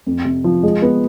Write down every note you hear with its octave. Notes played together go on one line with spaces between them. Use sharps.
F2
C3
F3
G#3
B3